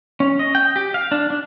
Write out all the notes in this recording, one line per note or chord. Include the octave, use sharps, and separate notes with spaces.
C#4
D#5
G5
G4
F5
D4
D4